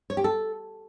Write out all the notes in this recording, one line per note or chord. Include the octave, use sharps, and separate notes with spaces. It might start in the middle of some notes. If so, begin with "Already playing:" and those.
C#5
G4
A4